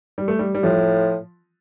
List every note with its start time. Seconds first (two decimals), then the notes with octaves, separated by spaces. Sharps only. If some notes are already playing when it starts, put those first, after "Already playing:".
0.18 G3
0.28 A3
0.39 G3
0.55 G3
0.63 A2 F3